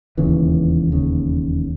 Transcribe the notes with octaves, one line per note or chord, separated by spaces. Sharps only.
E1 D#2 C#3 E3
E1 D#2 C#3